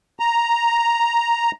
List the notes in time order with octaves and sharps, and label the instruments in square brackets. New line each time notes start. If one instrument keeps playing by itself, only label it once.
[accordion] A#5